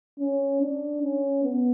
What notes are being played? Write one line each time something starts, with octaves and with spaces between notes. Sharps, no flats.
C#4
D4
C#4
B3